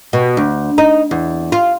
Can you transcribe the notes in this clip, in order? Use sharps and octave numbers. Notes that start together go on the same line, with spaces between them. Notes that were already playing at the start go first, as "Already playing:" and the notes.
B2
D2
D#4
E2
F4